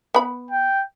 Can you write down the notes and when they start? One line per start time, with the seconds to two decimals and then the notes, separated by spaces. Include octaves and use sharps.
0.14 B3 B5
0.50 G5